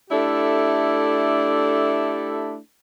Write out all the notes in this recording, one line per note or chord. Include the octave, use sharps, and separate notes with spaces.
A3 D4 E4 G4 A4